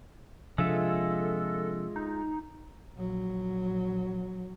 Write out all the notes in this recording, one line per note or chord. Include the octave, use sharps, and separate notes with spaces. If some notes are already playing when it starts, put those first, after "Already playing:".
C3 F3 G#3 D4 F4 A4 E5
D#4
A#1 F#3